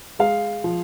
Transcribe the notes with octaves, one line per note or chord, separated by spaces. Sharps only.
G#3 F5
F3